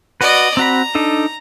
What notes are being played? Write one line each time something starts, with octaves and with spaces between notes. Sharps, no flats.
F#4 B4 D5 D#5
C4 F#4 A#5 B5
D4 D#4 A4